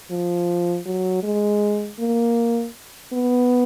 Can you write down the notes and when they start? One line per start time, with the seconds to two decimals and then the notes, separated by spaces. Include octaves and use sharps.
0.11 F3
0.86 F#3
1.23 G#3
2.00 A#3
3.13 B3